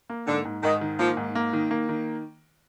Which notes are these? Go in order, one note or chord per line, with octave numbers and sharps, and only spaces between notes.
A#3
G#2 D3
G#2
G#2 D#3
D#3
F3 A#3
G#2
A#3
D#3
A#3
D#3